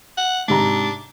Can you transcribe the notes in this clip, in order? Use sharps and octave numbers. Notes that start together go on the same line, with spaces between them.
F#5
G#2 C3 D4 A#5